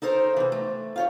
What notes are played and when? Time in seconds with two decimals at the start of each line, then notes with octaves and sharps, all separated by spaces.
0.02 D#4 A4 A#4 C5 C#5
0.37 C3 E3
0.52 A3
0.96 F4 G4 C#5